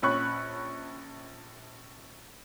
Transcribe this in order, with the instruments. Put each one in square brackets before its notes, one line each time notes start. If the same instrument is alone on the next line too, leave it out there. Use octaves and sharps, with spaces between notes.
[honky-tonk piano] A#1 C#4 C#5 B5 C#6 F#6